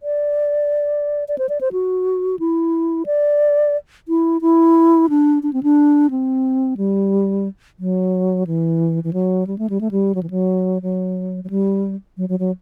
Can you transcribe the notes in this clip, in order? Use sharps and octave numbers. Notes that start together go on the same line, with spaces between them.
D5
D5
C5
D5
C5
F#4
E4
D5
E4
E4
D4
D4
C4
D4
C4
G3
F#3
E3
E3
F#3
G3
A3
G3
A3
G3
F#3
E3
F#3
F#3
F#3
G3
F#3
F#3
F#3